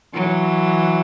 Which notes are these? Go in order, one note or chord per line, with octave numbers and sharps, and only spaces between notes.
E3 F#3